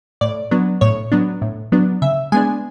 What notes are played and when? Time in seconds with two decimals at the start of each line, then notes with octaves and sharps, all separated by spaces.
0.21 A2 D5
0.51 F#3 B3 D4
0.81 A2 C#5
1.12 F#3 B3 D4
1.42 A2
1.72 F#3 B3 D4
2.02 C#3 E5
2.32 G#3 B3 D4 G#5